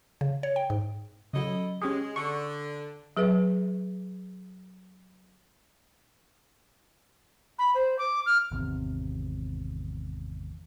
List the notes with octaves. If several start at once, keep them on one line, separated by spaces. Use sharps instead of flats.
C#3
C#5
G5
G#2
C#3 F#3 E4 A4 D#5
G#3 C#4 G4 G#4
D3 C#6
F#3 G#4 B4 E5
B5
C5
D6
F6
G#1 E2 C3